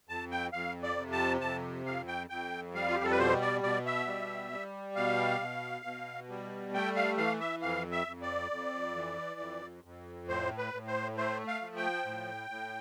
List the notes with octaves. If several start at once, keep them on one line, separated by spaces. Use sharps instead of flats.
F2 A5
G5
F2 F5
D5
C3
A5
F2 A5
F2 F5
G5
F2 G5
G3 F5
F4
G4
A4
B4
B2 C5
D5
B2 D5
E5
G3
G3
B2 F5
B2
B2
G3
A3 G5
F5
E3 F5
E5
F2 F5
E5
F2
D5
F2
E3
F2
F2
A2 C5
B4
A2
C5
A3 C5
F5
F3
G5
A2
A2